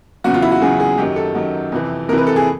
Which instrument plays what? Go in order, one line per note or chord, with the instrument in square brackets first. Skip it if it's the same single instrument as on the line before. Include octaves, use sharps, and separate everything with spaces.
[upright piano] E2 C#3 F#3 F#4
F4
E4
F#4
E2 C#3 F#3 G#4
G#4
F#2 D#3 F#3 G4
A4
F#2 D#3 F#3
F2 C3 E3
F2 C3 E3 A#4
B4
A4
G#4